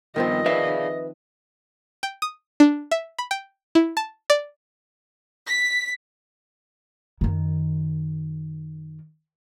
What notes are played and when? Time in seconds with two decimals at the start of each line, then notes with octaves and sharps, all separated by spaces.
0.16 G2 D#3 F3 B3 C4 D#5
0.46 G#4 B4 D5 E5 F5
2.03 G5
2.22 D#6
2.60 D4
2.91 E5
3.18 B5
3.31 G5
3.75 E4
3.97 A5
4.30 D5
5.48 B6
7.21 F#2 D#3